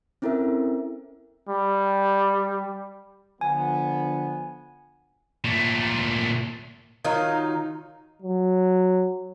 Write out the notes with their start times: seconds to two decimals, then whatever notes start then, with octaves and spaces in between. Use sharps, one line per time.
0.22 C4 C#4 E4 A4 A#4 E5
1.49 G3
3.41 D3 F3 B3 G#5
5.44 A#2 A3
7.05 D#3 F#3 D#4 F4
8.22 F#3